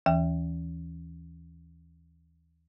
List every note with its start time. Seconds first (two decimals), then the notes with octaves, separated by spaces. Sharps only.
0.06 D#2 E3 G5